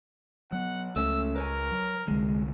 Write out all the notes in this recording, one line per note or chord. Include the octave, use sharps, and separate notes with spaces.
F#3 B3 F#5
C#2 A3 C#4 E6
A#4 B4 C#5 G#5
F#3
C2 D3 G#3